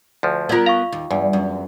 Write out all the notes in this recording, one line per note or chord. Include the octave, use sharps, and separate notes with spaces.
D2 F3
B3 F4 A#4 D5 E6
F5 A#5 C#6
D#2
E2 G2
F#2